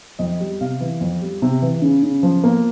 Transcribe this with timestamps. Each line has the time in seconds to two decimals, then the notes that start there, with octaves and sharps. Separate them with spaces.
0.19 F2 D#5
0.40 G3
0.61 C3 F5
0.80 E3
1.01 F2
1.22 G3
1.42 C3
1.62 E3
1.82 C#3
2.03 C#3
2.23 F3
2.44 A#3